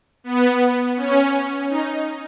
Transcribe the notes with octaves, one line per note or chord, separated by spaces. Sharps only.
B3
C#4
D#4